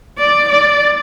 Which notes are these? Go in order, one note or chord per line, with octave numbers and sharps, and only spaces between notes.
D5
D5